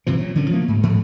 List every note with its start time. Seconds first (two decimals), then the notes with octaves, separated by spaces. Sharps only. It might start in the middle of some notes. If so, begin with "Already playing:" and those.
0.07 G1 C3 E3 F3
0.18 A#2 F#3
0.35 D3 D#3 F#3 C#4
0.50 F3 F#3 A3 A#3
0.68 G#2
0.83 D2 G#2 F3 A3